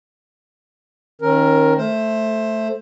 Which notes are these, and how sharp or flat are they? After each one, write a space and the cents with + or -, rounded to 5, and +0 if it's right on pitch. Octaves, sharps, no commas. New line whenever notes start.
D#3 +0 C#4 -30 A#4 +10
A3 +0 C5 +15